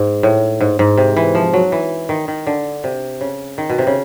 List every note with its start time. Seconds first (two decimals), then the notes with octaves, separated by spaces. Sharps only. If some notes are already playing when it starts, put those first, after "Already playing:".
Already playing: G#2
0.23 A2
0.60 G#2
0.79 G#2
0.97 C3
1.16 E3
1.35 F3
1.54 F#3
1.72 E3
2.09 D#3
2.28 D#3
2.47 D3
2.84 C3
3.21 C#3
3.58 D#3
3.69 B2
3.79 C3
3.87 C#3